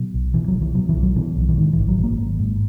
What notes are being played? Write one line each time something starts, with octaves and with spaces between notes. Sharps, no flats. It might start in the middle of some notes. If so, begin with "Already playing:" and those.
Already playing: B2 F#3
B1
B2 E3
F#3
B1
E3
B2 F#3
E3
B1
F#3
B2 E3
B1
E3
G#2 D#3
G#1 E3
F#3
G#2 A#3
G#1
G#2